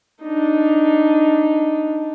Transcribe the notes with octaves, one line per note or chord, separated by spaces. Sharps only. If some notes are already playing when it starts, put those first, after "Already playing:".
D4 D#4